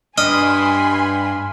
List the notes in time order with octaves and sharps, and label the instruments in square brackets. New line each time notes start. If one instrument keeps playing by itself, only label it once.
[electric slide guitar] G2 D4 [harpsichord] D#5 [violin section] G#5 B5 C6 [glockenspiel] F6